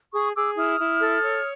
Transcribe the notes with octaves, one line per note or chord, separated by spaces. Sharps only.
G#4 C#6 D#6
G#4 D6 E6
E4 D#6 F6
E4
A4
C#5